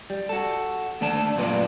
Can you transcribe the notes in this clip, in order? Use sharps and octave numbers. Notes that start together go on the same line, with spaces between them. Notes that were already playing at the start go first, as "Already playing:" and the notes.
G3
F#4 A4
D#2 D3 A3 D5 A5
F#2 A#2 F4 B4 D5